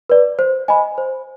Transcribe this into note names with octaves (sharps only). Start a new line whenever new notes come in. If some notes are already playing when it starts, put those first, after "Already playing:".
B4 D5
C5
D#5 G#5 B5
C5